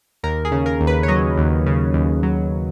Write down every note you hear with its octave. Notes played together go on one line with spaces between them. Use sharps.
D#2 A#4
G#4
C#3
A#4
D#2
B4
C#5
F#3 D#5
D#2
C#3
D#2
F#3